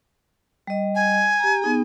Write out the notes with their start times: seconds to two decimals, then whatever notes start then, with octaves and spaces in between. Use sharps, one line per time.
0.67 G3 D#5
0.95 G#5
1.39 G4 A#5
1.62 B3 D#4 G#4